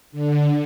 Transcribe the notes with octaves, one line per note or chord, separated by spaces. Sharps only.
D3